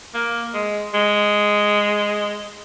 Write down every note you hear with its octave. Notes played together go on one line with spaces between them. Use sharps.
A#3
G#3
G#3